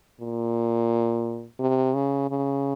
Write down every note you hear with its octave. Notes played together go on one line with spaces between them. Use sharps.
A#2
C3
C#3
C#3